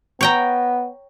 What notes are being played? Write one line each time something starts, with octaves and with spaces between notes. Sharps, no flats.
B3 C#5 G5 A#5